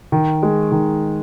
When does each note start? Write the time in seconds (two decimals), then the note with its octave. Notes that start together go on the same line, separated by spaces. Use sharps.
0.12 D#3
0.43 G#3
0.72 D#3